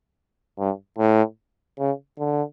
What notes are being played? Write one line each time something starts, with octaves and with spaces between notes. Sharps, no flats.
G2
A2
C#3
D3